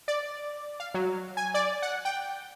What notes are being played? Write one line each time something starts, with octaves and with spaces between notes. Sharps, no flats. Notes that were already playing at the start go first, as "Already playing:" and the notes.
D5
F5
F#3
G#5
D5
F#5
G5